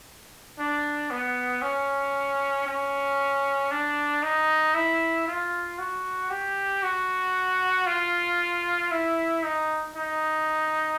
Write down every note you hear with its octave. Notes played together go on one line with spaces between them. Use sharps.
D4
B3
C#4
C#4
D4
D#4
E4
F4
F#4
G4
F#4
F4
E4
D#4
D#4